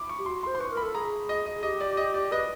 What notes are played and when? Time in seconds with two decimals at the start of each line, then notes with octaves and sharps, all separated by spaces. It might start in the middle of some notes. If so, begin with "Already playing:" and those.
Already playing: B5 D6
0.09 C#6
0.19 G4
0.26 F#4 C6
0.43 C6
0.47 C5
0.55 C6
0.59 B4 C#6
0.71 A#4
0.77 B5
0.82 A4
0.95 G#4 A#5
1.29 D#5
1.46 D#5
1.63 G4 D#5
1.81 D5
1.97 D#5
2.14 D5
2.32 B4 D#5